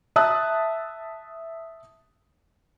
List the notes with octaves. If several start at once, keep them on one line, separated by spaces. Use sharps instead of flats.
E5 A5 D#6 F#6